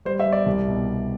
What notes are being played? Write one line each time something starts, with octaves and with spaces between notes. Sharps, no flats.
G3 C5
E5
G3
D5
C2
B2